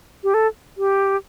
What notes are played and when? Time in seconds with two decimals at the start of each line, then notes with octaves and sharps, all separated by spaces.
0.24 G4
0.34 A4
0.77 G4